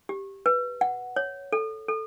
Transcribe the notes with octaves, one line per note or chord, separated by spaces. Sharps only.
G4
B4
F#5
C#5
A4
A4